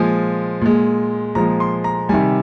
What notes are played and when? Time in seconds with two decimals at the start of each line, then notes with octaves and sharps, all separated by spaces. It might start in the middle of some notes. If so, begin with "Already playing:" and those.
Already playing: A#2 F3 G#3 G#5
0.61 A#2 G#3
1.35 A#2 F3 G#3 A#5
1.60 C6
1.84 A#5
2.09 C3 D#3 G3 G#5